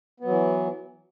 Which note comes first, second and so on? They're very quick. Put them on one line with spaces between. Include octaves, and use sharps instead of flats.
B3 F#3 E3